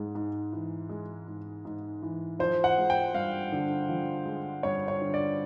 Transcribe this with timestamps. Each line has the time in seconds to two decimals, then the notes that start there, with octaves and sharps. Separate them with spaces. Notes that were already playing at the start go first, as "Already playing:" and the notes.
Already playing: G#2 G#3
0.15 G#2
0.52 E3
0.89 G#3
1.28 G#2
1.65 G#2
2.02 E3
2.39 F3 C5
2.64 F#5
2.77 G#3
2.90 G5
3.14 G2 F5
3.52 D3
3.89 F3
4.26 G#3
4.63 G2 C#5
4.88 C#5
5.01 D3
5.14 D5